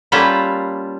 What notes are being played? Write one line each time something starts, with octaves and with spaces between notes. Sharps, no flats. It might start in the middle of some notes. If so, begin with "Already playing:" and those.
G3 A#3 C#4 F4 A4 B4